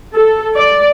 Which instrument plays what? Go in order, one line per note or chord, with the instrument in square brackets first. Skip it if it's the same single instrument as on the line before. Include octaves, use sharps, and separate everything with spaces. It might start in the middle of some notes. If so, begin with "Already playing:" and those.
[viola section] A4
D5